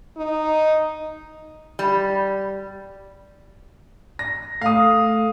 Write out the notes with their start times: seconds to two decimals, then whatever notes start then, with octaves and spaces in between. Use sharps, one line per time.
0.17 D#4
1.79 G3
4.19 A#6
4.62 A3 F5 D#6